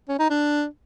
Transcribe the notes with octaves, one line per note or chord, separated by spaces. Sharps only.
C#4
D#4
D4